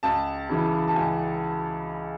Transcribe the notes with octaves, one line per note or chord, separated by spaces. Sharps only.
C#2 A5
C#3 E3
A5
C#2 G#5